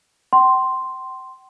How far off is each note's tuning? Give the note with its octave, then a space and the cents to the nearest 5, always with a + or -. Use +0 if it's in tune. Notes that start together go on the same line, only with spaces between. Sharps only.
G5 -45 C6 +0